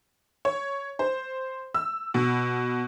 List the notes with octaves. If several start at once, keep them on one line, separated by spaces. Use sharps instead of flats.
C#5
C5
E6
B2